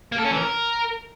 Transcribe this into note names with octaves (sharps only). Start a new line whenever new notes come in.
A#3
A4
C#4
E3
A#4